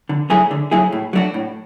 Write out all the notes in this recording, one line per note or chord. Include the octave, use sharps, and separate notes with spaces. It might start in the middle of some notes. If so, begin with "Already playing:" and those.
D3
F#3 A3 E4 G#4
D3
F#3 A3 E4 G#4
A2
F#3 A3 D4 F#4
A2